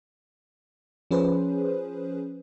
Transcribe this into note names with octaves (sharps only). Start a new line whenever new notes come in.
F3 C#4 G#4 B4 C5